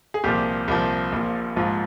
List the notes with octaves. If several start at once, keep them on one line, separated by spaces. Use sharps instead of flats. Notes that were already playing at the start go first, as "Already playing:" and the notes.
G#4
C2 A#2 F3 G4
C2 A#2 F3
A#1 A#2 F3
A#1 G#2 F3 F4